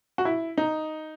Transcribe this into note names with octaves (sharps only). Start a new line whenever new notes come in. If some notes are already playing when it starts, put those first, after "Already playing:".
F#4
E4
D#4